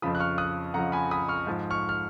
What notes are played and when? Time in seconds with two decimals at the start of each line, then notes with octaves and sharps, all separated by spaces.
0.02 F2 C#3 F3 B5 D#6
0.15 F#6
0.20 C#6 F6
0.38 D#6 F#6
0.74 F2 C#3 F3 F#5 A#5
0.92 G#5 B5
1.11 B5 D#6
1.28 C#6 F6
1.47 G#2 F3
1.70 C#6 F6
1.89 F6